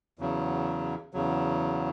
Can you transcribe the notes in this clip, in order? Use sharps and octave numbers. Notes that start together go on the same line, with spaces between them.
E2 C#3 F#3
E2 C#3 F#3